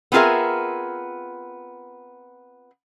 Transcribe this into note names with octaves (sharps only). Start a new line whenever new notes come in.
B3 C4 F4 G#4 A#4 E5